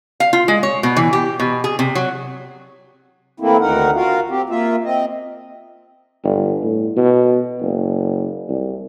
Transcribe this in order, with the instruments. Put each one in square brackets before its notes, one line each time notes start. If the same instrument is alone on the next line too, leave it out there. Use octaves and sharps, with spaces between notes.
[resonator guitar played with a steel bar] F5
F4
G#3
C#5
B2
E3
G4
B2
G#4
C3
F#3
[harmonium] E3 A3 A#3 C4 E4
D2 D#3 D#4 A#4 F#5
F4 F#4 A#4 F5
C4 G4
A#3 F4 E5
C4 D#5
[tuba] G1
A2
B2
F#1
C2